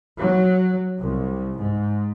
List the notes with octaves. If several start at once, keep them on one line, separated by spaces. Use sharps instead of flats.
F#3
C2
G#2